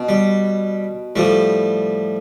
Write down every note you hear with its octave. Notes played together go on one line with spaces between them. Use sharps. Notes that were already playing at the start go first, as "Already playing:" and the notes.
Already playing: B2
G3
A2 F3 G3